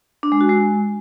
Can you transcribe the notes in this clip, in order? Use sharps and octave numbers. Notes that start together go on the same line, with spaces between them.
D4
G#3
F#4
G#3